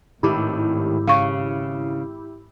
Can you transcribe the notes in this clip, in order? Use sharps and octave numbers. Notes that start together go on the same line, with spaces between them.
G#1 A2 D#3 E4 G4
C#3 F5 C#6